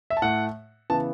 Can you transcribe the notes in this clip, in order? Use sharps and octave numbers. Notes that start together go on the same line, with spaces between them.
E5
A5
A2 A3 F#5
C#3 E3 B3 A5